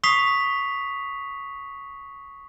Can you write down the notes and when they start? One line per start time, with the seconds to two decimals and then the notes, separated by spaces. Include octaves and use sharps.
0.04 C#6 D#6 B6 C7 F7